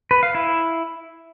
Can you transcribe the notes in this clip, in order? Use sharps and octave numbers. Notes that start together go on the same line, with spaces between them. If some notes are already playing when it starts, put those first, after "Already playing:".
B4
F5
E4